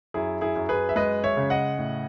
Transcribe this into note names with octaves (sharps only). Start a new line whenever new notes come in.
F#2 E4 G#4
E4 G#4
F#2
G#4 B4
E5
G#3 B4 D#5
C#5 E5
C#3
D#5 F#5
A2